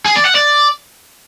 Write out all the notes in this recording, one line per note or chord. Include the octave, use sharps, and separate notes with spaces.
G#4
D5
F#5
D5